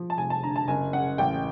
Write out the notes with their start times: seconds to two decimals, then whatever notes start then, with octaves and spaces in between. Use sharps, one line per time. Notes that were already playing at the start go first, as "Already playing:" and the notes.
Already playing: F3
0.10 A5
0.18 F1 G#5
0.30 A5
0.43 D3 A#5
0.56 A5
0.68 F#1 G#5
0.93 C#3 F#5
1.18 A1 G5